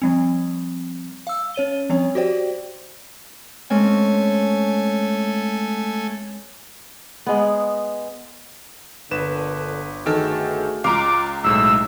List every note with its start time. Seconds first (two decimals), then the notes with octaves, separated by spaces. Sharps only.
0.02 F3 G3 C4
1.27 F5 E6
1.54 C#4 C#5 D#7 G7
1.90 F3 G3 C4 C#5
2.15 F#4 G4 C5 D5 G5
3.70 G#3 A3 C4 C#4 G#5
7.27 G#3 B3
9.11 G1 A#2 D3 B4 E7
10.06 D#3 A3 F#4 G#4 A4
10.84 C#2 F4 F5 A#5 D6
11.44 B1 A2 G#3 E6